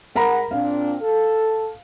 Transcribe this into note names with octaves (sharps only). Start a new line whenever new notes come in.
G#2 A#4 F#5 A#5 B5
A#2 C4 D4 F5
A4